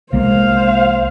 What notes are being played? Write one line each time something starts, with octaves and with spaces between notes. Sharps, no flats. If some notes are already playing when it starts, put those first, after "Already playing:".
C2 G#3 A#3 C5 F5